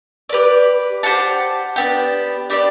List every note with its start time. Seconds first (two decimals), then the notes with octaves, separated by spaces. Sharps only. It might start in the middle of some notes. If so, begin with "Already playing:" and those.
0.29 G4 B4 D5
1.03 G4 C5 F#5 A5
1.76 B3 D4 G4
2.50 D4 G4 B4 D5